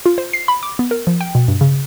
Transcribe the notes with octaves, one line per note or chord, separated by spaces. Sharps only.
F4
C5
C7
B5
D6
B3
A#4
F3
G5
B2
G2
C#3